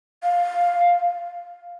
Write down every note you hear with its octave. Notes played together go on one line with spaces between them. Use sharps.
F5